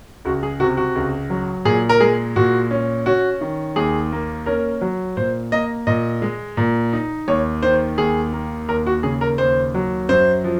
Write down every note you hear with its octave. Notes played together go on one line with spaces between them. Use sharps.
C#2 F#4
G#4
C3 F#4
F#4
C#2
F#3
A#2 G#4
A#4
G#3 G#4
A#2 F#4
C#4
C#4 F#4
D#3
D#2 G#4
A#3
C#4 A#4
F#3
A#2 C5
A#3 D#5
A#2 D#5
G#3
A#2
D#4
D#2 C#5
D#3 C5
D#2 G#4
A#3
D#2 A#4
F#4
C#3 G#4
A#4
D#2 C5
F#3
F#2 C5
F3